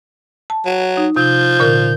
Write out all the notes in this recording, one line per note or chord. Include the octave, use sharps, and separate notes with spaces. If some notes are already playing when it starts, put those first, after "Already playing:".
A5
F#3
D#4
C3 F3 G6
A#2 D3 A#4